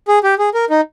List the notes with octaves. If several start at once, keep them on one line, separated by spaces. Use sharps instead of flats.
G#4
G4
G#4
A#4
D#4